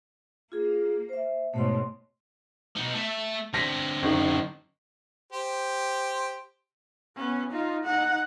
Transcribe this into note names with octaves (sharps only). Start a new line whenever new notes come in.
A#3 F4 G#4
C5 E5
G#2 B2 A3 C#5 C6
B2 D#4
A3 E5
D3 C4 A#6 B6
F#1 D#3
G4 C5
B3 C#4
D#4 F4
D#4 F#5